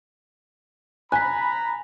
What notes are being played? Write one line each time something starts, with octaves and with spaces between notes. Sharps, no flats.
G#5 A#5 B5 F#6 B6